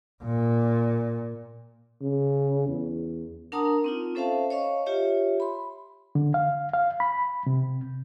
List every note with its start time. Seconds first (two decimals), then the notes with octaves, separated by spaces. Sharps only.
0.24 A#2
2.02 C#3
2.68 E2
3.52 D4 A#4 F#5 A5 A#5 D#6
3.84 C4 D#4 F4
4.15 C#4 A4 C5 E5 F5 A5
4.50 C#5 D#5 F5 C#6
4.86 F4 G4 C#5 E5
5.40 B5 C6
6.15 D3
6.34 F5
6.74 F5
7.00 B5
7.47 C3